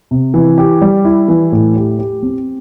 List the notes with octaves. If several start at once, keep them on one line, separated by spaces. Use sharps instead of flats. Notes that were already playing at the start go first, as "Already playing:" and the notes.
C3
E3
G4
G3
E4
E3
A2
G4
G4
C4